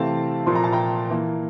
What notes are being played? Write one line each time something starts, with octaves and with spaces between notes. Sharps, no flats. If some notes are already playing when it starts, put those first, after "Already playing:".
Already playing: C3 E3 A3 C4 F5 A5
A#2 F3 A#3 C6
A#5
A5
G5 A#5
E3 A#3